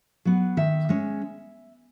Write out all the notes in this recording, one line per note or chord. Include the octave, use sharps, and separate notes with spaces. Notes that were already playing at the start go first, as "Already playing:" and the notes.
F#3 B3
D#3 E5
G#3 C#4